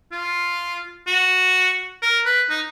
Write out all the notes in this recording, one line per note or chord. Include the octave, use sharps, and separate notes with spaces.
F4
F#4
A#4
B4
D#4